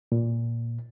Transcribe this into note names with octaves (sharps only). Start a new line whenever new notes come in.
A#2